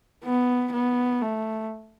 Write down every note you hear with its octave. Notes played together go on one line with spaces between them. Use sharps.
B3
B3
A3